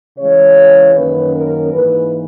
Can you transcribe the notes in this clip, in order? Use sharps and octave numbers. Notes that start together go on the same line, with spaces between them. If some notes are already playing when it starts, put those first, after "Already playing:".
C#3 E3 G#3 C#5
F#2 D#3 A#3 C#4 B4
A#4
G#2 E3 A#3 B4